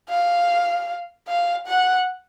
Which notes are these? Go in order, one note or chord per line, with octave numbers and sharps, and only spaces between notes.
F5
F5
F#5